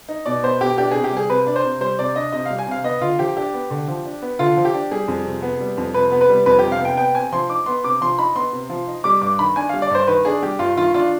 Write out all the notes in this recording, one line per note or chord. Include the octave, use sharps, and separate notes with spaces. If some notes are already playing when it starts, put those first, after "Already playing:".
D#4
B2 D5
B3 C5
B2 G4
D4 G4
C3 G#4
G4
G3 G#4
C3 B4
D4
C5
C3
G3 C5
C3 D5
D4 D#5
C3 D#5
G3 F5
G#5
C3 F5
B3 D#5
D3 F4
F3 G4
D4 G4
B3
D3
F3
D4
B3
D3 F4
F3
G4
D4
G3 G#4
F2
C3
B3
G3
F2
C3 B4
B3
B4
G3
F2 B4
G4
C3
F5
B3 G5
B3 G5
C3 G#5
F3 C6
D#4 D6
B3 C6
C3 D6
F3 C6
D#4 B5
B3 C6
C3
F3
D#4
G3 D6
G2 D6
D#3 B5
D4 G#5
G3 F5
D5
G2 C5
D#3 B4
D4 G#4
G3 G4
G2 F4
D#3 F4
D4 F4